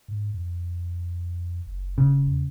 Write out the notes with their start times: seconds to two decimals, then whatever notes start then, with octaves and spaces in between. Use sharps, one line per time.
0.08 G#2
0.34 F2
1.67 F#1
1.98 E1 C#3
2.27 E2